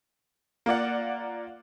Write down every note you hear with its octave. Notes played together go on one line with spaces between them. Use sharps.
A#3 F4 D5 F#5